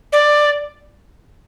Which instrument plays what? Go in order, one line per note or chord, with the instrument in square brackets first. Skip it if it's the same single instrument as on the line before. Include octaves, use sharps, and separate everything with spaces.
[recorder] D5